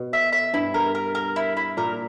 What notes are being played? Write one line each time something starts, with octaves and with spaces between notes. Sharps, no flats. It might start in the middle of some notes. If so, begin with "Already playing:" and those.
Already playing: B2
E5
E5
G2 E4
A#4
A#4
A#4
E4
E4
A#2 A#4